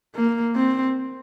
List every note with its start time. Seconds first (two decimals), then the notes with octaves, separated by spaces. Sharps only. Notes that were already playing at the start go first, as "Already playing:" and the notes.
0.16 A#3
0.56 C4